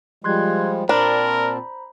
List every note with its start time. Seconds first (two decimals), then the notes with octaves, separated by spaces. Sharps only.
0.24 F3 G3 G#3 C6 F#6 G#6
0.89 A#2 C4 D4 A#4 C5 A#5 B5